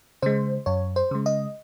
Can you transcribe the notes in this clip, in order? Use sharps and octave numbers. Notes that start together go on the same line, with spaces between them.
C#3 G#3 C5
F#2 C#5
C5
C#3 G#3
D#5